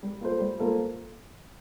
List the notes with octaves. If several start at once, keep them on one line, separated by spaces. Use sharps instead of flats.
G3
A#3 F4 A4 C5
G3
A#3 F4 A4 C5